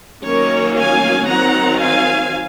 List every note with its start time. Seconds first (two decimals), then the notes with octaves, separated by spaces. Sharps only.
0.23 D#3 F#3 A#3 C#4 A#4 C#5
0.76 F5 G#5
1.28 D#3 F#3 C4 F#5 A#5
1.81 F5 G#5